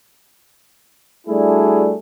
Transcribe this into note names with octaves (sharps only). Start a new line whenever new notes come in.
G3 A3 D4 E4 F#4 G#4